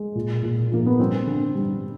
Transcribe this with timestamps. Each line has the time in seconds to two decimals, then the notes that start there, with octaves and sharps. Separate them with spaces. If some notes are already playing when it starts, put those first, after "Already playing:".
Already playing: G#3
0.15 A#2
0.43 A#2
0.72 F3 A#3
0.86 B3
1.00 G3 C4
1.27 D3
1.55 G3